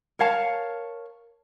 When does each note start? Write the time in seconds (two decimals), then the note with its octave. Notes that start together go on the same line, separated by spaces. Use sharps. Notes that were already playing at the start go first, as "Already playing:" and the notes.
0.19 A#4 C#5 F5 A5